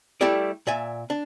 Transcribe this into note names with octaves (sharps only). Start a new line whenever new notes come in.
G3 A3 E4 G4 D5
A#2 D5 E5 G#5
D4